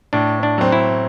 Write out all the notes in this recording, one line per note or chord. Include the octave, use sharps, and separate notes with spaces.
A2 D4
D4
F#3 C4
E4